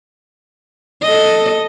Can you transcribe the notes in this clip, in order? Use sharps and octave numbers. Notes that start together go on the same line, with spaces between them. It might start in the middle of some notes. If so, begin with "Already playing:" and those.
A4 D#5